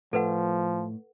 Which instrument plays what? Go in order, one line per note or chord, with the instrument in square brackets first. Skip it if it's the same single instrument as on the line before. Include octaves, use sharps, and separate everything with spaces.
[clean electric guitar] A2 [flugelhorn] F3 [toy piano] A4 B4 F#5